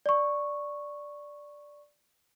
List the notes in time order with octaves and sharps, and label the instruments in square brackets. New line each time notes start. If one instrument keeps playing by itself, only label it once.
[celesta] D5 C#6